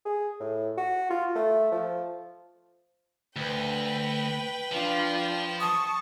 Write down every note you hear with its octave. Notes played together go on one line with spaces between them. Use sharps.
G#4
A2
F#4
F4
A3
F3
D2 B4 G5
F3 D4 F4
A5 C#6 D#6